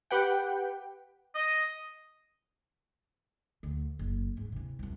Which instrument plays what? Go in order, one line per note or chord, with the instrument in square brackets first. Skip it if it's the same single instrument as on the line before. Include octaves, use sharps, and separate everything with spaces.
[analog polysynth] G4 B4 F#5 G5
[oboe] D#5
[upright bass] D2
F#1
G#2
C3 E3
C2 F#2